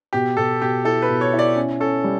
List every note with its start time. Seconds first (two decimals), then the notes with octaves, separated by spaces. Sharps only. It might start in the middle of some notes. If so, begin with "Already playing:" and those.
0.13 B2 G4
0.37 B2 A4
0.61 B2 G4
0.85 E4 A4
1.02 B4
1.09 B2
1.21 C#5
1.33 E4
1.39 D5
1.56 C#4
1.80 C#4 A4
2.04 G3